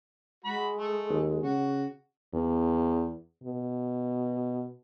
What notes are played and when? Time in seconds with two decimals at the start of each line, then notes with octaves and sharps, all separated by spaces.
0.45 G#3 F#4 B5
0.78 A3
1.09 D#2
1.43 C#3 F#4
2.34 E2
3.43 B2